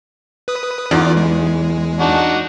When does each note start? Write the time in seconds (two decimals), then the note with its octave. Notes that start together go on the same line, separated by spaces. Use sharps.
0.48 B4 D#6
0.91 E2 D#4 F4 D5
1.17 G#3
2.00 D4 D#4 F#4